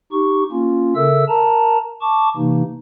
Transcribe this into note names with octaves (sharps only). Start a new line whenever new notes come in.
D#4 G4 C#6
A#3 C#4 F4
C#3 A4 A#4 E5 E6
A#4 A5 A#5
A5 C#6 D6
C3 E3 A#3 D#4